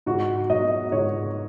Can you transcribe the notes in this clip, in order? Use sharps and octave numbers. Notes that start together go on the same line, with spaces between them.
G#2 F#4
F#3 D#5
G#2 C#5